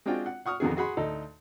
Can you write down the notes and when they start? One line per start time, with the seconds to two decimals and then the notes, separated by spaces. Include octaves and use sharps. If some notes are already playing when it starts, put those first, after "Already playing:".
0.06 G#3 C4 D4 F4 F#4 G5
0.26 F#5
0.46 F#5 C#6 D#6 F6
0.60 F2 D3 D#3 B3 G#4
0.77 F#4 G#4 F#5 B5 C6
0.97 D2 D#4 A4